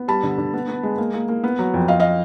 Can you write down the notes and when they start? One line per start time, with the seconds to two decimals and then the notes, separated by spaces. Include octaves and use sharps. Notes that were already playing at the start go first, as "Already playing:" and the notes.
Already playing: B3
0.08 G3 A5 B5
0.23 D3
0.38 D3
0.54 B3
0.68 B3
0.83 G#3
0.98 A#3
1.13 A#3
1.28 A#3
1.44 B3
1.59 F#3
1.74 F2
1.88 F2 D#5 F5
2.00 D#5 F5